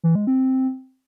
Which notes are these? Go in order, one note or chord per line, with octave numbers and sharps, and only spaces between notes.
E3
G#3
C4